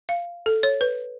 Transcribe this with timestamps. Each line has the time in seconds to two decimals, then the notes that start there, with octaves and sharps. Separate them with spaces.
0.09 F5
0.46 A4
0.63 C#5
0.81 B4